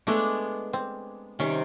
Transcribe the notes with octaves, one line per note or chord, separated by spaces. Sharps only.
G#3 A3 B3 D4
C4
C3 D#3 G3 C#4